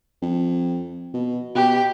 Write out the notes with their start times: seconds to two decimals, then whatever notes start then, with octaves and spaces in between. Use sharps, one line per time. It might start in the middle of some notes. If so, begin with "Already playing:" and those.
0.22 F2
1.14 B2
1.55 B2 G4